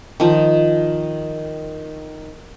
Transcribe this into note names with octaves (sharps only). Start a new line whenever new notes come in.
D#3 F3